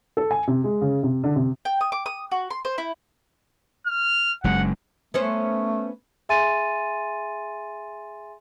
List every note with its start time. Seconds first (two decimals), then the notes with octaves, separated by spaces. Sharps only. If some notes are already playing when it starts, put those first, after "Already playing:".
0.17 A4
0.31 G#5
0.47 C3
0.64 G#3
0.81 C#3
1.03 C3
1.24 D3
1.36 C3
1.65 G5
1.81 D#6
1.92 D6
2.06 D#6
2.32 F#4
2.50 C6
2.65 C5
2.78 E4
3.87 F6
4.44 F#1 F#2 G#3 F#5
5.14 A3 B3 C#4 C5
6.29 G#4 E5 G#5 C6 A6 D#7